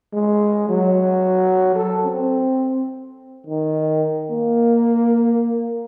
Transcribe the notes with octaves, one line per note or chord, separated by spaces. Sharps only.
G#3
F#3
A4
C4
D#3
A#3